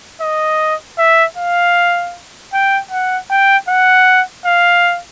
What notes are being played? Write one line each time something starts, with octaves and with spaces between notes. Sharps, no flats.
D#5
E5
F5
G5
F#5
G5
F#5
F5